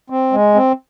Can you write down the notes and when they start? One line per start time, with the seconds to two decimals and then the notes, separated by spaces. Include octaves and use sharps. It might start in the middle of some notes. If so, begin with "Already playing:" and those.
0.10 C4
0.32 G#3
0.54 C4